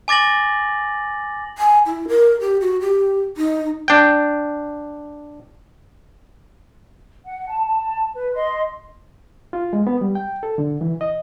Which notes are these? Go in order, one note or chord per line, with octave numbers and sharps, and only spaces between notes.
G#5 D6 A6 A#6 F#7
G#5
E4
A#4
G4
F#4
G4
D#4
D4 G5
F#5
A5
A5
B4
D#5 C6
F4
G#3
B3
G3
G5
A4
D3
E3
D#5